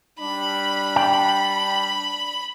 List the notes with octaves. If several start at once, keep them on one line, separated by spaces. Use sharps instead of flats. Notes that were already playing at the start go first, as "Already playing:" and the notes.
G3 D4 B5
G5